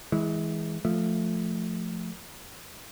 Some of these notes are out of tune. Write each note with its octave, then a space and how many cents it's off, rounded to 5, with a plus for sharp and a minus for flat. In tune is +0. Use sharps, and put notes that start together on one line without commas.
E3 -25 G#3 +0
F3 +0 A3 +0